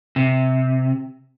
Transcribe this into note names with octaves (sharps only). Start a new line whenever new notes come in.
C3